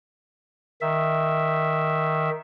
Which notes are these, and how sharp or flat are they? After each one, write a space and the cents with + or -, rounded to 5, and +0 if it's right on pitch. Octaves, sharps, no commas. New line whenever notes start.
D#3 +0 E5 +0